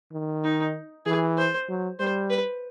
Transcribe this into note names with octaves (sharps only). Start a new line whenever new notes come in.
D#3
D#4
E3 G#4
C5
F#3
G3 C5
B4